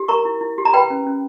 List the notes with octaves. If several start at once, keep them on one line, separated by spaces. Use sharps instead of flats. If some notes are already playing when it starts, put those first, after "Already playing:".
Already playing: G4
A#4 A#5 C#6
E4
E4
G4
A#5
B4 G5 B5
C#4
C#4